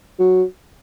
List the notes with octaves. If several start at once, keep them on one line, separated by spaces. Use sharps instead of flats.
F#3